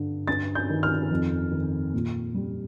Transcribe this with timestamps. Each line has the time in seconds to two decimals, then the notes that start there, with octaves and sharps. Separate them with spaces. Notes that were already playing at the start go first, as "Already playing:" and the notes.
Already playing: G2 D3
0.28 G2 A6
0.55 G6
0.70 D#3
0.83 F6
1.11 F2
1.51 D#3
1.94 A#2
2.34 G3